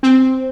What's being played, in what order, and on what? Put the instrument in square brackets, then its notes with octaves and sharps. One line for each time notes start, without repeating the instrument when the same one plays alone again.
[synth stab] C4